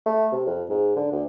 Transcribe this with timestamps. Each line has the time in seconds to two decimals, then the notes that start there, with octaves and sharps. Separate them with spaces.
0.06 A3
0.32 C3
0.47 F2
0.69 G#2
0.96 D3
1.12 D2